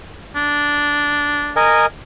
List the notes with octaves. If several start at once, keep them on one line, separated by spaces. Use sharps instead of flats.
D4
A#4 D#5 G#5